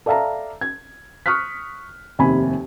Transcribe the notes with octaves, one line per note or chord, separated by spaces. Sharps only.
A4 D5 E5 F5 A5 A#5
G#6
C#6 D#6 F6 F#6 B6
F1 D#2 C3 G#5 B5